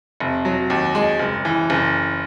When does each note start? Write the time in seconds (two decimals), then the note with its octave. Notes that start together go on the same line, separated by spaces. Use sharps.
0.20 F1
0.45 F#3
0.70 D#2
0.95 G#3
1.19 F#1
1.45 E3
1.70 F#1